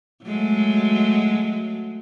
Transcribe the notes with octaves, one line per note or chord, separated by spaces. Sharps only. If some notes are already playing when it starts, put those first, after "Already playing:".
F#3 G#3 A3